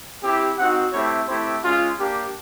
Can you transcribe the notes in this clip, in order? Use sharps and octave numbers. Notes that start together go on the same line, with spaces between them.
C4 E4 G4
C4 D#4 F#4 F#5
A3 C4 E4 G4 C#5
A3 C4 E4 G4 C5
G#3 C#4 F4
A#3 D4 G4